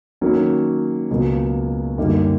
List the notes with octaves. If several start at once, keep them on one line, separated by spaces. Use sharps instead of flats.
D#3 F#3 A#3 C#4 F#4
C#2 B2 F#3 A#3
F#2 D3 G3 A#3 D#4